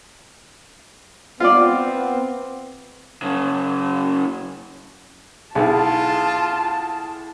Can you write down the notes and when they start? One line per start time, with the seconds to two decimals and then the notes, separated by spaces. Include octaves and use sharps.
1.40 B3 C4 F4 D5
3.22 F#2 C#3
5.55 B1 E4 F4 G#4 A5